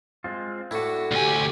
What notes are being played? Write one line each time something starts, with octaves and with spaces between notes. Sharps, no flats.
G#3 C4 F4
A2 D4 E4 F#4
D2 G4 G#5